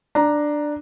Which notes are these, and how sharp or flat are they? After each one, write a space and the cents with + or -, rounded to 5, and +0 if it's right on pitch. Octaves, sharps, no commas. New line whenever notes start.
D4 +10 A#5 +0